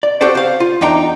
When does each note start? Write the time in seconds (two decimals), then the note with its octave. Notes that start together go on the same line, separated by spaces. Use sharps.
0.03 D5
0.21 F#4 G4 A4 C5 D5
0.35 C5 F5
0.60 F4
0.81 E2 D4 D#4 G5 A#5